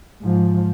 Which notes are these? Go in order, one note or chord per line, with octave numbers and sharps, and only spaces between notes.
G#2 F3